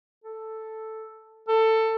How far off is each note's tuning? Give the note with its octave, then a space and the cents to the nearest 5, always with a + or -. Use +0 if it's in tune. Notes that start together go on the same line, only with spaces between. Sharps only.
A4 +0
A4 +15